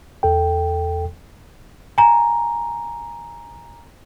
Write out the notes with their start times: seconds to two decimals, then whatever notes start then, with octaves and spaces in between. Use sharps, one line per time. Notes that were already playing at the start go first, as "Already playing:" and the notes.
0.23 E2 A4 G5
1.98 G#5 A#5